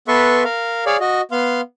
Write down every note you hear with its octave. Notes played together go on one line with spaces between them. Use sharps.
B3 A4 B4 E5 C6 C#6
A#4 F5
G#4 C#5 D5 F5
F#4 D#5
B3 F5 C6